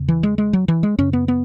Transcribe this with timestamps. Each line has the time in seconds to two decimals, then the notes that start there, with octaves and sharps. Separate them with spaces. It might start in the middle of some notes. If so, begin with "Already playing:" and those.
Already playing: E2 C#3
0.08 E3
0.23 G#3
0.38 G#3
0.53 F#3
0.68 E3
0.83 G#3
0.98 F#2 C#3 C#4
1.13 B3
1.28 B3